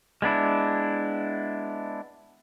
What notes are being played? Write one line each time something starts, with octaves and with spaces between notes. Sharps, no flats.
G#3 B3 D4 E4